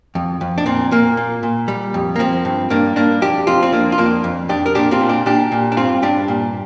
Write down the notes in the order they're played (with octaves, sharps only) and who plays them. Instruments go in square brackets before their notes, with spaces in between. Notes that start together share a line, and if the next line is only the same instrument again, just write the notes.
[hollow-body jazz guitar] F2
F2
D4
A#2 C4
A#2 A#3
A#2
A#2
G3
F2
A#3
F3 C4
G2
G2 A#3 D4
G2 A#3 D4
F2 D4 G4
F2 C4 F4
C4
F2 A#3 D4
F4
F2 A#3 D4
F2
F2 D4 G4
A#4
A#2 D4 G4
C4 F4
A#2
D4 G4
A#2 D4 G4
A#2
D4
G2 C4 F4
G2 D4 G4
A#2